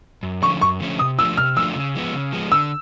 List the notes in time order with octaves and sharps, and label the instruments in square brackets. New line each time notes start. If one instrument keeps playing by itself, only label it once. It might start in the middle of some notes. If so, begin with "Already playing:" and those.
[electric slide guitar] F#2
[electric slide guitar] D3 F3 A3 C#4 [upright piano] C#6
[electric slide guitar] F#2 [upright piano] C#6
[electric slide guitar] D3 F3 A3 C#4
[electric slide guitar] C3 [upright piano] D#6
[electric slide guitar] F3 A3 D4 F4 [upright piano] E6
[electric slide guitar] C3 [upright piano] F6
[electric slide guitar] F3 A3 D4 F4 [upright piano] E6
[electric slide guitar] C#3
F3 G#3 B3
C#3
F3 G#3 B3
[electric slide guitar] D3 [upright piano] E6